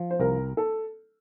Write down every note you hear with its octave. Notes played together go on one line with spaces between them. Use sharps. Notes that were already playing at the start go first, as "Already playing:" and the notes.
Already playing: F3
C5
C2 A#4
A4